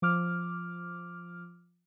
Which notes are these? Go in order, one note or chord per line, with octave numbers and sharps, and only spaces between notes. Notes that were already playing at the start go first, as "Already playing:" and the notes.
F3 D6 F6